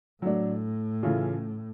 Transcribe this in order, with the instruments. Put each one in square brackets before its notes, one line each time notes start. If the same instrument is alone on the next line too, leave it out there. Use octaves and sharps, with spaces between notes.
[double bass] A2 [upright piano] F#3 A3 D4
[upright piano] C#3 E3 A3 C#4 F4